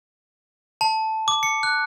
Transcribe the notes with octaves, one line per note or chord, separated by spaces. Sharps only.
A5
D6
C#7
F#6